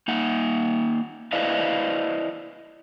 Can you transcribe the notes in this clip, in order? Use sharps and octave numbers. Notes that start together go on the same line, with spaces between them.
A#3 D#4 F#5
E4 B4 C5 D5 D#5 F5